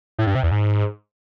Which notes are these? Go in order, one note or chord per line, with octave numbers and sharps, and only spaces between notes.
A2
G2
C3
E2
G#2